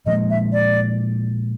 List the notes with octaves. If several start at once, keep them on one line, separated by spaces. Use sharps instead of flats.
A#2 F3 G#3 D#5
E5
D5